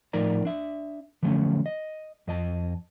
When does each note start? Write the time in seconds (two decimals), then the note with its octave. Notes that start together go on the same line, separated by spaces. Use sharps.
0.13 A2 F3 D#4 A#4 D5 A#5
0.45 D4 E5
1.23 D3 F3 F#3 A3 C#4
1.66 D#5
2.27 F2 D#5 A5